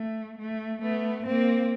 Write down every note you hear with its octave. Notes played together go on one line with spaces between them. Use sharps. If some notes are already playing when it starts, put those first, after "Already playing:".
Already playing: A3
A3
A3 B3
A#3 C4